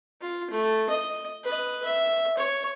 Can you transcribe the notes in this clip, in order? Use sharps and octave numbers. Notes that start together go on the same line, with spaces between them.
F4
A3
D#5
B4 D#5
E5
C#5